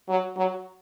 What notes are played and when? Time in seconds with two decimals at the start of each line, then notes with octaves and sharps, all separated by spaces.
0.08 F#3
0.36 F#3